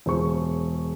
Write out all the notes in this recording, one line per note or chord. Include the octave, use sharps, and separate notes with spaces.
E1 G#4 C5 C#6